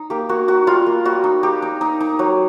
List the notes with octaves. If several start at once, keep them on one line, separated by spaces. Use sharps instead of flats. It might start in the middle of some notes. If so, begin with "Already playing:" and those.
Already playing: D#4
A#3 G4
A#3 F#4
D#4 F#4
G3 F4
A#3
G3 F#4
D#4
D#4 G4
D#4
D#4
D#4
F#3